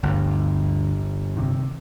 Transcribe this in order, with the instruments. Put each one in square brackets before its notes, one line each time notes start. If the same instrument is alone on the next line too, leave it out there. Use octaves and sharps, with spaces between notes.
[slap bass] G1 [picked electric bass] D2 G2
[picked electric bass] C3 D#3